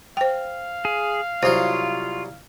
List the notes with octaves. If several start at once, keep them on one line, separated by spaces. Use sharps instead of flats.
C5 F5 G5
G#4
C2 F#3 F4 C5